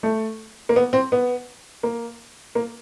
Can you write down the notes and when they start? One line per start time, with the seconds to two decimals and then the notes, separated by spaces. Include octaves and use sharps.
0.03 A3
0.69 A#3
0.76 B3
0.93 C4
1.12 B3
1.83 A#3
2.55 A#3